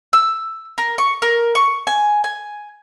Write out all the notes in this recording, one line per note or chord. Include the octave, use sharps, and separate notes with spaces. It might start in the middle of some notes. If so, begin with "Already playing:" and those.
E6
A#4
C#6
A#4
C#6
G#5
G#5